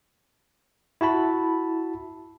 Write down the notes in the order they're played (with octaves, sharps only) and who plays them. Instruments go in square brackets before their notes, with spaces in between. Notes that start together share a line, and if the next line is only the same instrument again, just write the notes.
[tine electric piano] E4 F#4 A5 B5